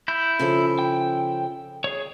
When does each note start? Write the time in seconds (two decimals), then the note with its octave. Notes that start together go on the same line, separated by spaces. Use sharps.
0.08 E4 G6
0.39 C#3 F3 A4
0.79 G5
1.84 G#4 C#5